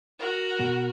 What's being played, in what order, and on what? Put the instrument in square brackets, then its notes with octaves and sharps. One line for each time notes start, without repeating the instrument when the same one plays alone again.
[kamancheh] F#4 A#4
[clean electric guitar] B2